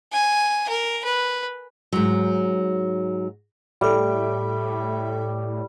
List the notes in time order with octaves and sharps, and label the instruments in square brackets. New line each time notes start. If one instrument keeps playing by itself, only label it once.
[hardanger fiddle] G#5
A#4
B4
[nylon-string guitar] G#2 F#3
[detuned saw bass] A2 [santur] G3 D6 [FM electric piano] A4 E5